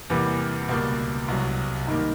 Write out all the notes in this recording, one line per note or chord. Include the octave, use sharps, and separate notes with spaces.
E2 C3 E3 G3 A#3
C#2 B2 G3 A#3
C2 B2 F#3
G#2 D#3 G3 A#3